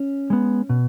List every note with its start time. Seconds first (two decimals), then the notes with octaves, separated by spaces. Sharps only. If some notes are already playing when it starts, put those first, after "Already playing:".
Already playing: C#4
0.30 G#3 B3
0.69 B2